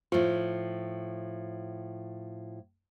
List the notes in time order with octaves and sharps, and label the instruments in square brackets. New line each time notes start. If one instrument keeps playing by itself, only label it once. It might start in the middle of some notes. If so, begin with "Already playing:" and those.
[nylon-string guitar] A2 F3 [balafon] F4